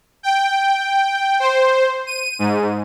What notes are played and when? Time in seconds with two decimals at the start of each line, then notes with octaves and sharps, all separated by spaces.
0.23 G5
1.40 C5
2.07 D#7
2.39 G#2